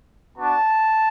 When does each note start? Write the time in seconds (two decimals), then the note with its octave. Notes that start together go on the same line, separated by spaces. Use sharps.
0.37 B3 D4 F#4 A5